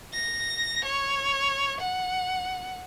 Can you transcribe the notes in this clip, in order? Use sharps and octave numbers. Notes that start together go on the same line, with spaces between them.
A#6
C#5
F#5